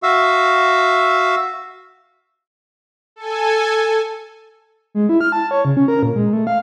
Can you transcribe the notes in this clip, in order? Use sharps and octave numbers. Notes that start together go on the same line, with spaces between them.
F#4 E5 F5 E6
A4 G#5
G#3
E4
F6
A5
C#5
C#3
C#4
A#4
A#2
G#3
A3
F5